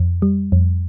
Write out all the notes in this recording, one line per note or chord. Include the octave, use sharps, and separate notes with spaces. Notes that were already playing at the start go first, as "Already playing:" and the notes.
Already playing: F2
G3
F2